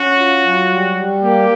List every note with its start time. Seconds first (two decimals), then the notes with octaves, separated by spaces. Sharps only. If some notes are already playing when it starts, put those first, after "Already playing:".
Already playing: C#4 F#4
0.19 F4
0.45 F#3
0.71 G3
0.97 G3
1.22 A#3 G4